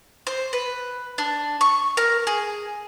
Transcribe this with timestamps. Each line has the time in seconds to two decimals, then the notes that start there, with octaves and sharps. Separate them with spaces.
0.27 C5
0.53 B4
1.18 D4
1.61 C#6
1.97 A#4
2.27 G#4